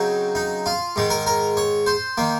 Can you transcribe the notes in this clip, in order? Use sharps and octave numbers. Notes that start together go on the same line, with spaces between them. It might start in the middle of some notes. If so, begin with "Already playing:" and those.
Already playing: C#3 F#3 C4 D#4
D#4
F4
G#2 D#3 G#3
A#4
A#4
C#5
C5
D#3 A#3